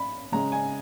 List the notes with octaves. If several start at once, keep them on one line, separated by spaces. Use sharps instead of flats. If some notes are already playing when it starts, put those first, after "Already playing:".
Already playing: B5
C#3 G#3 C#4 A#5
G#5